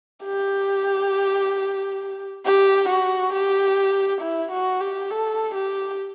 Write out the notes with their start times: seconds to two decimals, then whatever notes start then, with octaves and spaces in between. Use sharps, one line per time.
0.24 G4
2.46 G4
2.89 F#4
3.33 G4
4.21 E4
4.52 F#4
4.81 G4
5.10 A4
5.55 G4